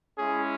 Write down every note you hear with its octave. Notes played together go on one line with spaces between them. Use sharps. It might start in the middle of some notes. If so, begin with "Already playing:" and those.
G#3 C#4 E4 G#4